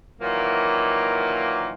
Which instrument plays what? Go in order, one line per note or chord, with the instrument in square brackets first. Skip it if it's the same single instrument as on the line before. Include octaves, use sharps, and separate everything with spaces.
[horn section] A#2 D#3 E3 F#3 A#3